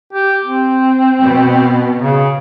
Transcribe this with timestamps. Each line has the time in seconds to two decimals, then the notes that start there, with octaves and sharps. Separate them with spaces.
0.13 G4
0.45 C4
1.24 B2
2.00 C#3